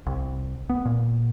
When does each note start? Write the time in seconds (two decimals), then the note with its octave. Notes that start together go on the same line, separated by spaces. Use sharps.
0.06 C2
0.70 B3
0.85 A#2